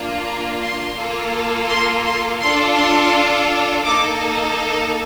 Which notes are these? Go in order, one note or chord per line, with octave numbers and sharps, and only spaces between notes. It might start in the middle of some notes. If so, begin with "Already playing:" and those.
Already playing: A#3 D4 F4
A#5
C6
A#3 F4 A4
C6
C6
D4 F4 A4 C6
C6
A#3 D#4 A4 D6